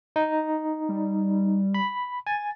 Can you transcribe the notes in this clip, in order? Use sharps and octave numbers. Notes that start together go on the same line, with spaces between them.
D#4
G3
B5
G#5 A6